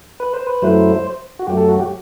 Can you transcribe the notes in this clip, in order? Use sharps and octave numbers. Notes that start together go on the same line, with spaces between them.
B4
C5
B4
F#2 F#3 A3 E4 C5
F#4
F#2 F#3 A3 G4
A4
F#4
G4